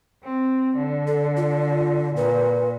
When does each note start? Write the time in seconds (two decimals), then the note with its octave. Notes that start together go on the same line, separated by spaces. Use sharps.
0.24 C4
0.77 D3
1.07 A4
1.37 F4
2.16 A#2 B4